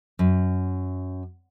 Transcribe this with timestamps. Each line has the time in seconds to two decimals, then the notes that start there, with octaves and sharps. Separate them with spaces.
0.19 F#2